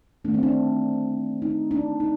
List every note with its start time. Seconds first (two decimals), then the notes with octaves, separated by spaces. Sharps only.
0.25 D#3 A3 D4
0.34 C4
0.43 D4
1.42 D#4
1.71 D4
2.00 D#4